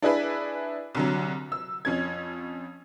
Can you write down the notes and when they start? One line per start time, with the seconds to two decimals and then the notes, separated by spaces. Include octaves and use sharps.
0.02 D4 E4 G#4 B4 E5
0.95 C2 D3 F#3
1.52 E6
1.85 F2 C#4 G#6